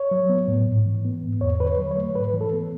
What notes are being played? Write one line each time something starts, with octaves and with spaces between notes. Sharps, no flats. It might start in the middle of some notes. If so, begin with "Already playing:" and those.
Already playing: C#5
F#3
B3
A2
G#2
E3
B3
G#2
E2 C#5
D3 B4
C#5
F#3
C#5
A3
G#2 B4
E3
A4
B3